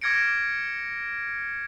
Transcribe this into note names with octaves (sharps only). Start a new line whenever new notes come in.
D6 F6 G#6 A#6 C#7 D7